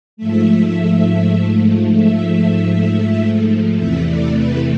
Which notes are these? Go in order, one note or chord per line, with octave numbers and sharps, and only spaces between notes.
G#2 F3 A3 E5
E5
E2 C3 E3 A3 E5
D5
B4